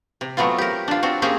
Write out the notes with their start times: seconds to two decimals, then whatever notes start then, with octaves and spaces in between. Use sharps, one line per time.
0.21 C3
0.37 F#3 A3 B3 C4 F4
0.58 G4 A#4
0.88 D4 F4
1.03 C4 D4 F#4
1.22 A#3 C4 C#4 G4 G#4